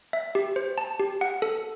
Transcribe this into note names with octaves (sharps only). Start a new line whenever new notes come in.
E5
G4
C5
A5
G4
F#5
A4